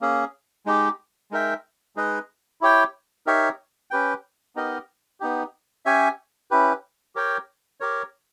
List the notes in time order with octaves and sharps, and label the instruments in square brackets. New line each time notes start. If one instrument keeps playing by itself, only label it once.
[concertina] A#3 C#4 G#4
G#3 D#4 G4
G#3 D#4 A#4 E5 G5
G#3 D#4 G#4 B4 D#5
E4 G4 C#5 G5
D#4 G4 A#4 C#5 E5
C#4 G4 B4 G5
B3 D#4 G4 A#4 D#5
B3 D#4 G4
C#4 G4 C#5 E5 G#5
C#4 E4 G4 B4
G4 A#4 C#5 G5
G4 A#4 C#5